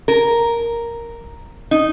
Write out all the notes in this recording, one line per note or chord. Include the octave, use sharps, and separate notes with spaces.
A#4
D#4